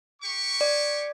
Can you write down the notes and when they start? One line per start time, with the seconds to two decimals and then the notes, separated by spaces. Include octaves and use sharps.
0.22 G4 C#6
0.61 D5